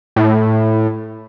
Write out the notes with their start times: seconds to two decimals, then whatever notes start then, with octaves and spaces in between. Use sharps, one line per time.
0.16 A2